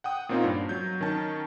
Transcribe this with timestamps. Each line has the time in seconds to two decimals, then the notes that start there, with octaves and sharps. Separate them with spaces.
0.04 F#5 G5 D#6
0.29 A#2 A#3 C4 C#4 D#4 F4
0.44 G2
0.69 F#3 G6
1.01 D#3 C#4 A5